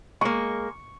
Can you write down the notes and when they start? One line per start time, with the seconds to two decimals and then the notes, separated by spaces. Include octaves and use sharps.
0.21 G#3 A#3 C#6